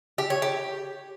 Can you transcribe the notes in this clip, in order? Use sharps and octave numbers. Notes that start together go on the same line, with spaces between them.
G4
C#5
G4